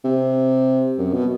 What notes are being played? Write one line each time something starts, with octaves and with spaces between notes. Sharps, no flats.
C3
F#2
B2